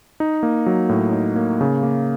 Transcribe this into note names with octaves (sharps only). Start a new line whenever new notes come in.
D#4
A#3
F#3
A2
D#4
A#3
C#3
A#3